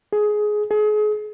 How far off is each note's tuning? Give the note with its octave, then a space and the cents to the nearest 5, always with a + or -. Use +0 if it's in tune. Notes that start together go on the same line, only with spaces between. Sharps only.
G#4 +15
G#4 +35